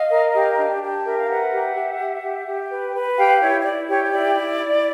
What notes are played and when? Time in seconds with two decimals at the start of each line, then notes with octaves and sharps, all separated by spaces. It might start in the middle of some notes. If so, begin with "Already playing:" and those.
Already playing: D#5 F5
0.11 A#4
0.35 G4
0.58 D4
0.82 G4
1.05 A#4 E5
1.17 F5
1.28 B4 E5 F#5
1.52 G4
1.75 G4
2.00 G4
2.24 G4
2.47 G4
2.70 B4
2.93 B4
3.17 G4 F5 G5
3.41 E4 C#5
3.61 C#5
3.65 E4 D5
3.88 G4 C#5
4.05 C#5
4.12 E4 D5
4.35 E4
4.59 E4